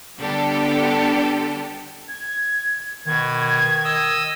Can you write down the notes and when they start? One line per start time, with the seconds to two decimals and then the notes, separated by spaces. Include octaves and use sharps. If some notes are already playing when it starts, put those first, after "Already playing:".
0.18 D3 G3 B3 D4 G4 A4
2.08 G#6
3.06 B2 D#3 G#6
3.84 D#5 D#6 E6